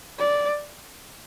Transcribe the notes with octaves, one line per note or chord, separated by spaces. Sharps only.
D5